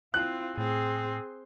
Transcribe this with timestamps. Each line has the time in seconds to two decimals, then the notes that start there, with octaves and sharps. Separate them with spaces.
0.14 C4 E4 F4 F#6
0.58 A2 C4 G#4